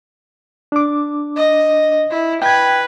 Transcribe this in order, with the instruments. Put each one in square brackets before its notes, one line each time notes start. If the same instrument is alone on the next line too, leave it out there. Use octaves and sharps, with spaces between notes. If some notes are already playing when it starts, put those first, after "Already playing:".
[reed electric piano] D4 D6
[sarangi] D#5
E4
[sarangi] B4 [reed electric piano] G5 G#6